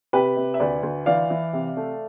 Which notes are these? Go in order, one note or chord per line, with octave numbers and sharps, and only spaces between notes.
C3 G4 B4
C3
E5
D2 B4 D5
D2
E3 D5 F5
E3
C3
A3